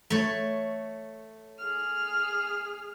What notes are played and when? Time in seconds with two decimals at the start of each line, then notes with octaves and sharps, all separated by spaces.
0.10 A3 C#5
1.59 G#4 F6